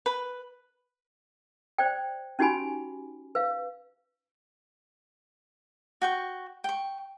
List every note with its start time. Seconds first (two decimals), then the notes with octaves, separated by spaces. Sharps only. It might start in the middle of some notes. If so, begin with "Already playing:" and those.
0.06 B4
1.78 C5 D5 G5
2.39 C#4 D#4 F#4 G4 G#5 B5
3.35 B4 F5
6.02 F#4 G5 C#6
6.64 G5 C#6